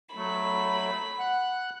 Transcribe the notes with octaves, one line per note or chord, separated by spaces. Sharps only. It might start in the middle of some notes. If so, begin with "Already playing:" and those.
F#3 A3 B5
F#5 F#6